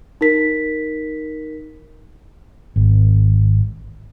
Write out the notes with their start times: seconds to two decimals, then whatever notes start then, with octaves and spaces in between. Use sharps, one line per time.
0.21 D#4 A#4 B6
2.76 G#1